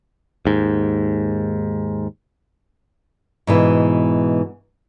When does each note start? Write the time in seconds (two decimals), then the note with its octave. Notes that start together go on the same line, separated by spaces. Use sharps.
0.45 D#2 G#2
3.47 G#2 B2 E3